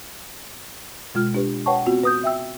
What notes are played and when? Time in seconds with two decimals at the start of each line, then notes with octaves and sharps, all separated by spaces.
1.15 B2 G#3 F4 F6
1.35 D4 G4 B4
1.66 B4 C#5 F#5 G5 A5 C#6
1.86 B3 C4 F4 F#4
2.03 B4 D#6 G6
2.24 E5 G5 E6